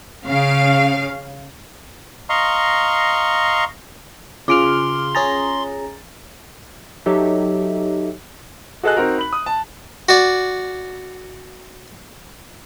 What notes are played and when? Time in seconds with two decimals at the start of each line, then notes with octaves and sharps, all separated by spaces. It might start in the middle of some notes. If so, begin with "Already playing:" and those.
0.25 C#3 F5
2.29 D#5 F5 A#5 C6 C#6
4.48 C#3 F4 G#4 B4 C6 D6 F6 D7
5.15 C#4 G#4 A#5 A6
7.06 F#3 D#4 G4 A4 D#5 E5
8.83 F#4 G#4 A4 D#5 G#5 F#6
8.97 C4 D#4 F#4 A#4
9.18 B5 F#7
9.33 D#6
9.46 A5
10.09 F#4 D5